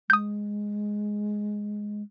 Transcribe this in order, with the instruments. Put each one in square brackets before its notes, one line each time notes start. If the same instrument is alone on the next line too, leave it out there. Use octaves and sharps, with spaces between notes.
[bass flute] G#3 [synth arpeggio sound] D#6 G6